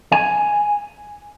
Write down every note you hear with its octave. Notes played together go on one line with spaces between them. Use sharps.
G#5